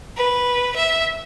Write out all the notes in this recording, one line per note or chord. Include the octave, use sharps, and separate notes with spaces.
B4
E5